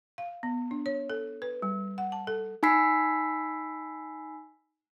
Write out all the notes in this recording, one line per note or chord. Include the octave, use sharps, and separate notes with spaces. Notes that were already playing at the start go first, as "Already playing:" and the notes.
F5
B3
D4
C#5
A4
B4
G3
F#5
A5
A4
D#4 G#5 B5 E6 B6 C7